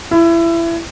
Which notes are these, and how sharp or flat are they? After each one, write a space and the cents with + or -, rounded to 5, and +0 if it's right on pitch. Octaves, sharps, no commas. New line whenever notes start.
E4 +25